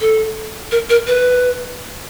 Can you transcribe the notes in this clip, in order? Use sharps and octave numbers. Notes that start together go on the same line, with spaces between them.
A4
A#4
A#4
B4